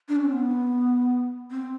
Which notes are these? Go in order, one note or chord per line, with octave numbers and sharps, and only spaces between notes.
D4
C#4
C4
B3
C4